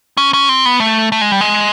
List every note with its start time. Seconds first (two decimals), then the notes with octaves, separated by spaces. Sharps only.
0.17 C#4
0.34 C#4
0.49 C4
0.65 B3
0.80 A3
1.12 A3
1.21 G#3
1.32 G3
1.41 G#3